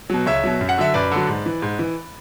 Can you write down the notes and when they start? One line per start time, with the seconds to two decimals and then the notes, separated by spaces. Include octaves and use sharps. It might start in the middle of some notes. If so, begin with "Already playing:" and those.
0.10 B2 F#3
0.26 C#2 C#5 E5
0.44 B2 F#3
0.61 F#2
0.69 F#5
0.78 D3 F#3 E5
0.94 F#2 B4 D5
1.11 D3 F#3
1.28 G#2
1.46 E3
1.62 G#2
1.79 E3